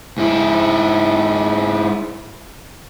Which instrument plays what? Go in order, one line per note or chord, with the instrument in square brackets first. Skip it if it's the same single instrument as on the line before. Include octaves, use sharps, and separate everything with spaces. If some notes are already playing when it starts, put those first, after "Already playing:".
[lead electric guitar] G#2 E4